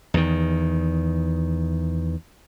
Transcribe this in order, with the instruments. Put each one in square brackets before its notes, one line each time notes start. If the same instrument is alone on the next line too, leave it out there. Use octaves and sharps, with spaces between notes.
[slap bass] E2 D#3